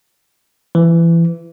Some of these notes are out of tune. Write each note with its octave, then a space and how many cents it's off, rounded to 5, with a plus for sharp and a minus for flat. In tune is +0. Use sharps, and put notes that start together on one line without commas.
E3 +25